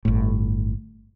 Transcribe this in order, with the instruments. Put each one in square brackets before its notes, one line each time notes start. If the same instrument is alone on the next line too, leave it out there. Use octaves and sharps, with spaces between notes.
[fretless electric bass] G1 A2